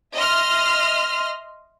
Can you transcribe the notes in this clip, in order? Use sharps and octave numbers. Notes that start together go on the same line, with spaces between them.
D#5 E5 C6 F6